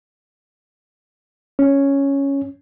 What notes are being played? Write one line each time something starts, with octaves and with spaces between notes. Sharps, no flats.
C#4